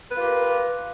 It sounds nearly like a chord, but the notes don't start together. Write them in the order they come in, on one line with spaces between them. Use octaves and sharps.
B4 F4 G4 A#4